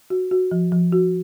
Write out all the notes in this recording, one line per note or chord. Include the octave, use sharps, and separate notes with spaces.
F#4
F#4
F3
F3
F#4